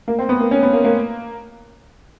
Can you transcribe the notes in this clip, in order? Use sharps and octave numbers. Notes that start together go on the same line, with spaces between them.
A#3
C4
B3
A#3
C#4
B3
A#3
A#3